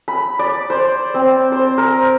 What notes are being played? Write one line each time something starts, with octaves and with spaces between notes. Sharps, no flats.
B5
D5
C5
C4
C5
A#4